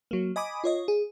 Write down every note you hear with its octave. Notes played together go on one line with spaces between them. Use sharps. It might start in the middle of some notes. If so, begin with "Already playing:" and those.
F#3 A#3
D#5 G#5 B5 D6 D#6
F4 C#5 D#5
G#4